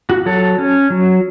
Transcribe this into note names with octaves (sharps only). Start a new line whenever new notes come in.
F#4
F#3 A4
C#4
F#3